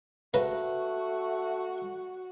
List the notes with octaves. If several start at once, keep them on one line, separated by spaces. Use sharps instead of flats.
C#3 A3 F#4 B4 A#5